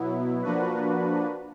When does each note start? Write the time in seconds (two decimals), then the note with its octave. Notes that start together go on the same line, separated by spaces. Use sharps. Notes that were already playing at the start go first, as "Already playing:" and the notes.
Already playing: B2 F#3 B3 E4
0.42 F3 A#3 D4 F#4 B4